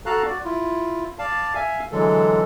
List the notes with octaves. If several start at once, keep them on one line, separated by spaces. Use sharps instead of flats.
F#4 A4 F5 A5 A#5 F#6
F#4 D5
E4 F4
D5 F5 A5
E5 F5 G#5
D3 E3 F#3 G#3 A4